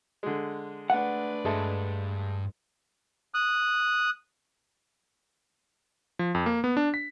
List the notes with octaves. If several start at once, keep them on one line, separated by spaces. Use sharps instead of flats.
D3 G#3
A3 D4 B4 F#5
G2 G#3 A4 E5
D#6 F#6
F3
F2
A#3
B3
D4
B6